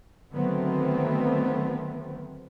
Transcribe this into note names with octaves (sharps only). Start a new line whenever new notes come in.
D3 D#3 F#3 A3 B3 C4